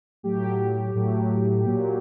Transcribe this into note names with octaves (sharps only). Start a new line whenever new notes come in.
A2 F#3 G4
A2 F#3
A#2 F#3